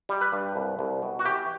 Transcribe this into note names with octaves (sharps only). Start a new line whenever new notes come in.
G3
B4
G2
C2
C2
B2
F#4
E3 G4